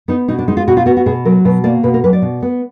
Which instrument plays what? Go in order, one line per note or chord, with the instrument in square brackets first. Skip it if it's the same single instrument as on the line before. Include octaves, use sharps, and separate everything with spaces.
[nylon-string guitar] B3 D#4
B2 D#4
D4
G#3 D#4
F4
B2 F#4
F4
B3 F#4
F#4
B2 G#4
F#3 A#4
B2 B4
A#3 D5
B2 B4
A#4
F#3 B4
D5
B2
B3